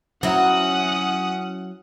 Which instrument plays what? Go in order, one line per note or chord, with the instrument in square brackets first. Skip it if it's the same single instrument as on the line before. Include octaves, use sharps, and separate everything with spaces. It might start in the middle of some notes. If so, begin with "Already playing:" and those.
[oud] F#3 E4 [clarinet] C#4 [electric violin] F#5 D#6